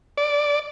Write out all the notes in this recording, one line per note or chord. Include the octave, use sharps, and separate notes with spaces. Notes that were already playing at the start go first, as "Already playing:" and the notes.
D5